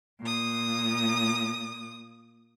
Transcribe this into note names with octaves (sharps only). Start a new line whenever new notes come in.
A#2 D#6